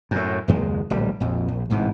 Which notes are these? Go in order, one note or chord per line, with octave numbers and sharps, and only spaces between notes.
F#2 A2
F#1 D#2 G#3
D1 A#1 G3
A#1 F2
A#1
A1 G#2 C3 E3